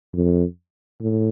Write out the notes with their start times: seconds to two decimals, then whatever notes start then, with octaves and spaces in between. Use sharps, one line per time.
0.13 F2
1.00 A2